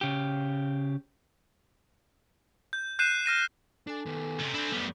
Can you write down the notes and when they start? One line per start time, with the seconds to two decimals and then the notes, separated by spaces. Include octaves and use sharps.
0.01 C#3 G4
2.73 G6
2.99 F#6 G6 C7 D#7 E7
3.26 F6 A#6 D#7
3.87 D4 A4 G#5 D6
4.06 D#3 B3
4.39 C#2 C3
4.54 C4 D4 E4
4.72 F#2 G3 A3 B3